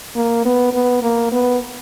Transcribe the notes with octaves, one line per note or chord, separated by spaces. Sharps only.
A#3
B3
B3
A#3
B3